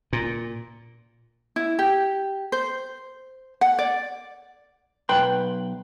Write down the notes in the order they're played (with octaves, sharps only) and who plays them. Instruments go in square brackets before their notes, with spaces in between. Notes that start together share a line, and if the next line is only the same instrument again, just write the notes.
[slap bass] A#2
[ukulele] E4
G4
C5
F#5
D5
[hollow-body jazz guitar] B1 B4 G5 C6